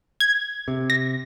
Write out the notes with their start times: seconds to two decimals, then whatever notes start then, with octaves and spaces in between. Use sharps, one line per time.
0.20 G#6
0.68 C3
0.90 A#6